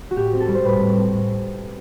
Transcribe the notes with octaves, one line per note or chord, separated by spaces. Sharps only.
F#4
A2 G4
C4
A4
G3
C5
A2 B4
A2
C4
A2